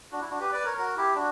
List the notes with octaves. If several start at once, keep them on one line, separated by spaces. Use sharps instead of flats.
D4 F#4
E4
D4 F#4
G4 B4
B4 D5
A#4 C#5
F#4 A#4
E4 G4
D4 F#4